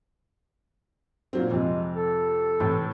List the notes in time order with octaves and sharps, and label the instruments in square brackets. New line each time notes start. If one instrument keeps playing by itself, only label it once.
[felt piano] A#2 F#3 C4
[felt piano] F2 C3 [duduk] G#3
[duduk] A4
[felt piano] A2 C3 E3